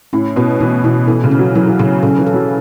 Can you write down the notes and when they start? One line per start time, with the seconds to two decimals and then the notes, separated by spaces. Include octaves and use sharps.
0.13 A2 C#4
0.36 B2 C#4
0.60 B2 E3
0.84 B2 E3
1.07 E3 A4
1.24 C#3
1.31 C#4
1.39 F#3
1.55 E3 F#3
1.67 E3
1.79 C#3 C#4
2.03 C#3 A4
2.18 E3
2.27 A4
2.34 F#3